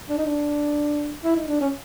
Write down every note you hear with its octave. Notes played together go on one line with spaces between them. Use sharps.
D4
D#4
D4
E4
D#4
D4
C#4